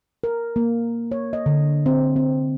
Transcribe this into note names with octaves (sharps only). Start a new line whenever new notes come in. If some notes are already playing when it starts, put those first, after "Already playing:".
A#4
A#3
C#5
D#5
D3
C4
C4